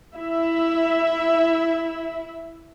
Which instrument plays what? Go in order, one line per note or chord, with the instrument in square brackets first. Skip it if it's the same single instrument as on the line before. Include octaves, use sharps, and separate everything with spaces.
[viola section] E4 E5